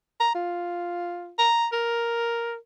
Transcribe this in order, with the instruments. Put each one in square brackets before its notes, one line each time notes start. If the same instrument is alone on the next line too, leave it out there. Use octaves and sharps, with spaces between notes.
[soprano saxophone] A#5
F4
A#5
A#4